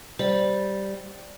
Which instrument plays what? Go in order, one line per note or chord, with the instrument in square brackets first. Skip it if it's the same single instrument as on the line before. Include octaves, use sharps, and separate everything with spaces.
[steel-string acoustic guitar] G3 [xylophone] C5 D5